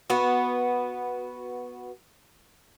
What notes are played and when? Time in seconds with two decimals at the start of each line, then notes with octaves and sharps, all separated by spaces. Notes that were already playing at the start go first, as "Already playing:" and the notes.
0.10 B3 F#4